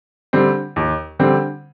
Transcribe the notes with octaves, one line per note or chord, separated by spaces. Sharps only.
D3 G3 C4
D#2
D3 G3 C4